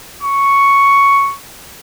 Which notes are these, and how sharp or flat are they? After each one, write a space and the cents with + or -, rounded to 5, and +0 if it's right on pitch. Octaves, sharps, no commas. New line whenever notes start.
C#6 +5